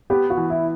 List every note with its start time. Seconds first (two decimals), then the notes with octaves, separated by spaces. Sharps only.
0.10 B3 G4
0.30 F#4
0.37 E3
0.50 E4